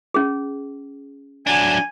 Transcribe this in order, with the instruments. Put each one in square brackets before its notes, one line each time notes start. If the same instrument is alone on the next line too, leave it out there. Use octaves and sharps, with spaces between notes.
[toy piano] C#4 G#4
[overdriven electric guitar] F#3 D4 [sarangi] G#5